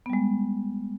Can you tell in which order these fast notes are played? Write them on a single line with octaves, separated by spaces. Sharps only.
B3 G3 G#3